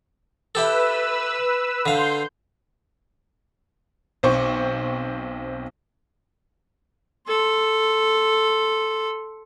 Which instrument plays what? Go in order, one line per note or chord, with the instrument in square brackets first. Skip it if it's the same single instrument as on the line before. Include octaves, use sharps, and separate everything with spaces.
[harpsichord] E4 G4 A4 [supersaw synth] B4 E6
[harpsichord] D3 F5 [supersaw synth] C6 G6
[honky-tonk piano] B1 C4 C5 C#6 D6
[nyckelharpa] A4 C6